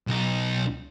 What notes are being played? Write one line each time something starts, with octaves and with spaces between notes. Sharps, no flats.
B1 D#4